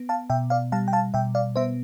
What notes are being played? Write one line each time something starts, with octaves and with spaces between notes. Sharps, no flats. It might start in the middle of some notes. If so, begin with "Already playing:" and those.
Already playing: B3
F5 A5
B2 E5 G5
D5 F5
G3 F5 A5
G5
F5 A5
B2 E5 G5
D5 F5
B3 C5 E5